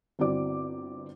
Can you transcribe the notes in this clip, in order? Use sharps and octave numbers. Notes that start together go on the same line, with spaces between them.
G1 C4 E4 F#4 D5 D6